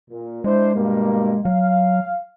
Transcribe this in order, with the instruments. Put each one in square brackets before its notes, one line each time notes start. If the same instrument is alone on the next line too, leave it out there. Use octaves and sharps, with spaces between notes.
[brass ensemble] A#2
[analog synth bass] G#3 [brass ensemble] D4 E4 C5
[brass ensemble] G2 B2 A#3
[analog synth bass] F#3 [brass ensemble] F5